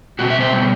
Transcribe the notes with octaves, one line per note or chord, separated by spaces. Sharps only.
B2 G3 C4 F#4
E5
C5
B2 G3 B3